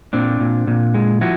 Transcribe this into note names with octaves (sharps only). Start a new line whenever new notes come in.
A#2 C4 D4
A#2
A#2
G#3
F3 E4 F#4